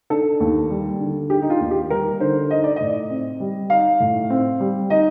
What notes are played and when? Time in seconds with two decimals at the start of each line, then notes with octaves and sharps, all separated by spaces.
0.10 D4 A4
0.40 D#2
0.70 G3
1.00 D3
1.30 D4 G4
1.42 D#4
1.50 F4
1.61 D#2
1.71 G4
1.90 G3 A#4
2.20 D3 C5
2.50 D#4 D#5
2.64 D5
2.76 A2 D#5
3.10 C4
3.40 G3
3.70 D#4 F5
4.00 A2
4.30 C4
4.60 G3
4.90 D#4 D#5